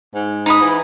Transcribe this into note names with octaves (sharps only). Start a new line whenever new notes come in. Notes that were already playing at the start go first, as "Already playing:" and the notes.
G#2
D#4 B5 D#6
E3